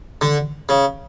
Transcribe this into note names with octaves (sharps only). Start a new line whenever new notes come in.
D3
C#3